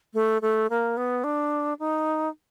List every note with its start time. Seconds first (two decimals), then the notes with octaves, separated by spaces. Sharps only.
0.14 A3
0.42 A3
0.70 A#3
0.97 B3
1.24 D4
1.79 D#4